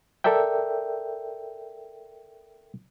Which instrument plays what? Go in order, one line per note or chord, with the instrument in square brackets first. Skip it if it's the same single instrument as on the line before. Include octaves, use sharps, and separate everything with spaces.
[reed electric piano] A4 A#4 D5 E5 G5